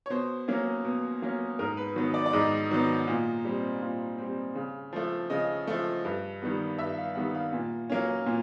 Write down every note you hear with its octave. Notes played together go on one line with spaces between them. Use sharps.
C#5
B2 C5
F#3 A#3 C#4
B2
F#3 A#3 C#4
G#2 A#4
B4
D#3 F#3 B3
D5
D5
G#2 D#5
D#3 F#3 B3
A#2
G3 C4
A#2
G3 C4
C#3
F3 A3
C#3 D#5
F3 A3
G2
D#3 G3 B3
G2 E5
F5
D#3 G3 B3 F#5
F5
A#2
F#3 A#3 C#4
A#2